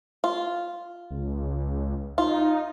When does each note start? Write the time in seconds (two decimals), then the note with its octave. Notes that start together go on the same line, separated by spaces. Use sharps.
0.24 F4
1.11 C#2
2.18 D#4 F4